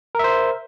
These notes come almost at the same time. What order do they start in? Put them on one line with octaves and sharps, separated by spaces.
A#4 E5 C5